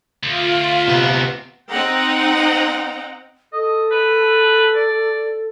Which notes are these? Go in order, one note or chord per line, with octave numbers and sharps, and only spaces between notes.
D2 F4
C3 B3
C4 D#4 F#5 G5 A#5
A4 D#5
B4
D5